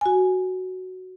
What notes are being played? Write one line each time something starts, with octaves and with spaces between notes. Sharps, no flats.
F#4 G#5